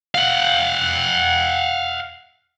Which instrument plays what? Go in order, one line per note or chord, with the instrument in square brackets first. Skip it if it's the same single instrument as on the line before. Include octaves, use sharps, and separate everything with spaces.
[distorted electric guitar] F5 F#5